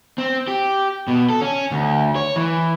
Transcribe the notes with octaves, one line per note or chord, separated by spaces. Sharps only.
C4
G4
B2
A4
C#4
D2
C#5
E3